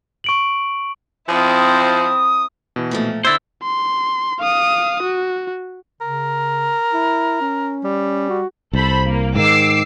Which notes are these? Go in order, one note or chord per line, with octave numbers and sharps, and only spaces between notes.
C#6 D7 F#7
F3 C4 E4 D#6
B2 E3
A#2 F3 A3
D3 C4 E4 C5 E6 G#6 A6
C6
F5 D#6
F#4
C#3 A#4
E4
C#4
G3
F#4
C2 A4 C5 B5
A#3
G#2 D#3 D6 E6 C7